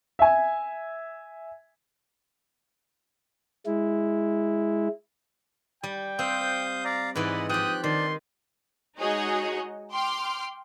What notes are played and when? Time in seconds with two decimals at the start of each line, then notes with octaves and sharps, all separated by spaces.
0.19 E5 G#5
3.66 G#3 E4
5.83 G3 G5
6.19 C4 F5 D#6 G6
6.85 D5 F5 A#5
7.16 G#2 E3 B4 D5 D#5 F#5
7.49 F3 G4 G5 D#6 F#6
7.84 D#3 D4 D5 C6
8.98 G#3 D#4 F#4 G#4 C#5 D#5
9.91 G5 C6 D6 F6